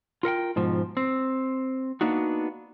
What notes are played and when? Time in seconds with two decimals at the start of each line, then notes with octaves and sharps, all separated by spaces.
0.23 F4 A#4 F#5 G5
0.56 G#2 B2 F3
0.97 C4
2.01 A#3 B3 D4 D#4 F#4